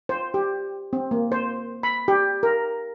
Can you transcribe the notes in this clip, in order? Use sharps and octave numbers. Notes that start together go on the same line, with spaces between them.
C5
G4
C4
A#3
C5
B5
G4
A#4